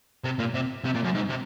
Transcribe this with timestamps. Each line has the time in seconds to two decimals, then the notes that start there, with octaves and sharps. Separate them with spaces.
0.24 C3
0.39 A#2
0.54 C3
0.85 C3
0.95 A#2
1.04 F#2
1.15 G#2
1.29 C3